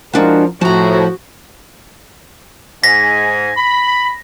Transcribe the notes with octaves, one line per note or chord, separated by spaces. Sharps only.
F3 G#3 D4 F#4 A#4
A2 F3 F#4 A5 A#5
G#2 G#5 A#6 B6
B5